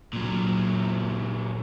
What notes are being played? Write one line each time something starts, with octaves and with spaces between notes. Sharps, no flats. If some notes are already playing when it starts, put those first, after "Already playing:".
A#2 F#3